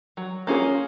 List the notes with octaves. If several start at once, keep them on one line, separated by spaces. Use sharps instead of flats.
F#3
A#3 C#4 F4 G#4